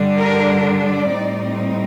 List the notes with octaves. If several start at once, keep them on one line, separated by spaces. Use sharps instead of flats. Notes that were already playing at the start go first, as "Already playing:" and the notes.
Already playing: G2 D3 G3 D4
A#4
D5
A2 G3 C4 D#4